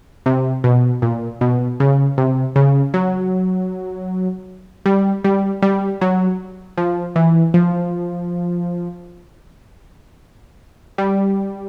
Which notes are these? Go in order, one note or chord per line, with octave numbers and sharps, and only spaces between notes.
C3
B2
A#2
B2
C#3
C3
C#3
F#3
G3
G3
G3
F#3
F3
E3
F3
G3